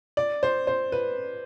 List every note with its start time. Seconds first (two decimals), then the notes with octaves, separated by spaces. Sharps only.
0.17 D5
0.43 C5
0.67 C5
0.92 B4